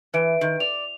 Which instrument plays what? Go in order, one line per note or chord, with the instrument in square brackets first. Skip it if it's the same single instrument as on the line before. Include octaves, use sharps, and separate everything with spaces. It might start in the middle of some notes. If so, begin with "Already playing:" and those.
[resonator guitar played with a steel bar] E3 [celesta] B4 D7
[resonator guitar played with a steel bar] D#3
[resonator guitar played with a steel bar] D5 [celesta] F7